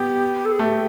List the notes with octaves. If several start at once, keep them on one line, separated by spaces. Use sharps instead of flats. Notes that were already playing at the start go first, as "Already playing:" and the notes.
Already playing: B3 G4
A4
G#4
A3 G4